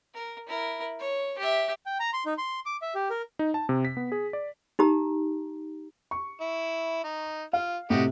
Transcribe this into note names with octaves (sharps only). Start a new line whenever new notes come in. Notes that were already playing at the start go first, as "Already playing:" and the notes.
A#4
E4 A#4
C#5
G4 E5
G5
A#5
C6
D#4
C6
D6
E5
G4
A#4
D#4
A5
C3
B6
B3
G#4
D5
D#4 G4 A#5
C#6
E4
D#4
F4 F5
A2 C3 F#4 G4 D#5